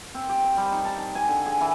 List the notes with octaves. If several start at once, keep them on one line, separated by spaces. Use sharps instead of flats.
C4
G4
C4
G3
D#4
A5
A#5
G#5
D3
G#4
E3